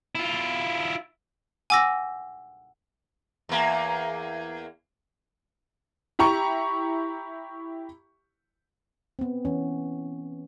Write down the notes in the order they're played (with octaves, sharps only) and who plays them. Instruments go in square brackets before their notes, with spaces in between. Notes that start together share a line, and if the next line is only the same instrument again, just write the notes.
[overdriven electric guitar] E4 F4
[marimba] F#5 E6 [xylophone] G#5 D6 A#6
[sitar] E2 A#3
[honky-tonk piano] E4 G4 A#5 C#6
[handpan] B3 C4
E3 C#4